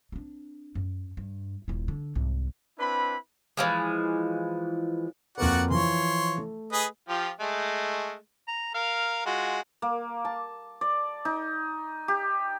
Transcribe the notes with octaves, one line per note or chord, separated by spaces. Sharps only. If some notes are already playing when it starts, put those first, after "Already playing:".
C4 D4
F#2
G2
D#1 E4
D3
C2 G#2
C4 D4 E4 B4 B5
E3 F3 G#3
F2 A#3 F#4 B4 D5 F#5
E3 F3 C#5 C6
A3
G#4 B4 D#5
F3 F4 G4
G#3 A3
A#5
A#4 F5
G#3 F4 F#4
A#3
A5
D5
D#4
G4